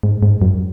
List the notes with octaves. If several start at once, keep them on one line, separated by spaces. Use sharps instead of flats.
G#2
G#2
F#2